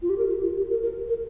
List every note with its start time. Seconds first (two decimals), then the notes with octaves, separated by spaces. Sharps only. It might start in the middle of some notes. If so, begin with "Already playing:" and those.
0.02 F4
0.09 G4
0.18 A#4
0.30 G4
0.43 F4
0.57 G4
0.70 A#4
0.83 A#4
1.08 A#4